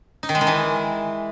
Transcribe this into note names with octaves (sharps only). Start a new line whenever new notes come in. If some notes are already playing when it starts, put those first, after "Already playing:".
D#4
D#3
G#3
D#3
E3